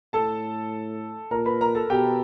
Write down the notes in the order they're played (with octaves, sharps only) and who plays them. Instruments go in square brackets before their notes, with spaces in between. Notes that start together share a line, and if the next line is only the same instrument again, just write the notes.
[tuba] A2 [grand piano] A4 A5
[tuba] A#2 [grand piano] A#4 A#5
[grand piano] B4 B5
A#4 A#5
A4 A5
[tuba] B2 [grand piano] G4 G5